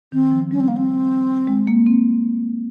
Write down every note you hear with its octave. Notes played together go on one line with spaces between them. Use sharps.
D#3 C4
F3
G3 C#4
C4
A#3
C4
G#3
A#3
C4